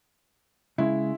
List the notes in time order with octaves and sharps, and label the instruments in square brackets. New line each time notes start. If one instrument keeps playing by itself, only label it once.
[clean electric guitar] C#3 G#3 [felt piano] E4